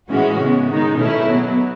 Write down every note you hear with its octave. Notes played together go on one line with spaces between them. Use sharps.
A2 E3 G#3 C#4 F#4
C#3 G#3 B3
D#3 G#3 D#4
B2 A3 C#4 E4
B2 F#3 B3